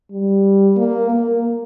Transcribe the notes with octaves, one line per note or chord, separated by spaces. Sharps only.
G3
A#3
A#3